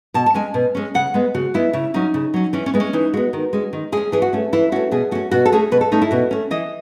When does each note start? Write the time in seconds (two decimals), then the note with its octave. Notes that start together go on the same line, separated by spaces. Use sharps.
0.14 B2 A5
0.26 A5
0.34 G#3 C#4 G#5
0.54 B2
0.75 G#3 C#4
0.94 C#3 F#5
1.14 G#3 B3
1.34 C#3 F#4
1.54 G#3 B3 E4
1.73 C#3 E4
1.94 F#3 C#4 D#4
2.14 C#3
2.34 F#3 C#4
2.53 E3 C#4
2.66 C#4
2.74 G#3 B3
2.80 C#4
2.93 E3 D#4
3.13 G#3 B3 F#4
3.33 D#3
3.53 G#3 C#4
3.73 D#3
3.92 G#3 C#4 G#4
4.12 E3 G#4
4.22 F#4
4.33 A3 C#4
4.53 E3 E4
4.72 A3 C#4 F#4
4.91 B2 G#4
5.11 A3 C#4 F#4
5.31 B2 F#4
5.46 A4
5.52 A3 C#4 G#4
5.71 B2 B4
5.81 A4
5.92 A3 C#4 D#4
6.02 E4
6.11 B2 F#4
6.31 A3 C#4
6.51 E3 D#5